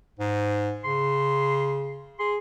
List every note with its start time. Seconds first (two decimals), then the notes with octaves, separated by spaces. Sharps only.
0.19 G#2
0.84 C#3 C6
2.19 G#4 C6